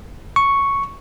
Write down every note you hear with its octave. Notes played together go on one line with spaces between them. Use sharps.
C#6